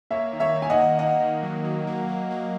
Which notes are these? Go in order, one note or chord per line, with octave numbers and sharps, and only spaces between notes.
A#3 C#5 E5
D#3
C#5 E5
D#3
G#5
D#5 F#5
A#3
A#3 D#5 F#5
D#3
F#3
F#3
A#3
A#3
A#3